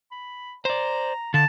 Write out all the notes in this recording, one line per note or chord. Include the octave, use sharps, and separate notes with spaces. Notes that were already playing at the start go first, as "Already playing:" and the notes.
B5
C5 D5 A#5
D3 F5 A5